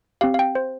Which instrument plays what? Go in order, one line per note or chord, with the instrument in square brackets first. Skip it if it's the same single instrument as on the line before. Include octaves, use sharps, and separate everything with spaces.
[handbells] C4 G4 F5
F5
G5
C5